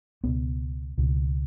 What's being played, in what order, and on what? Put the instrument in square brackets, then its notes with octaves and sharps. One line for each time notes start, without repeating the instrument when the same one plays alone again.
[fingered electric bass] C#2 B2 B3
C#2 B2